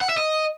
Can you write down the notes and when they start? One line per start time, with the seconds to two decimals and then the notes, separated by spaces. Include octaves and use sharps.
0.01 F#5
0.09 E5
0.17 D#5